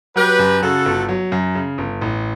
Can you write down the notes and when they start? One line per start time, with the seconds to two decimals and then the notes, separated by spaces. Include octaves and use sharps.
0.16 F#3 G4 B4
0.39 F#2
0.62 C#3 F#4 A4
0.85 G1
1.09 F#3
1.32 F#2
1.55 C#3
1.78 G1
2.01 A1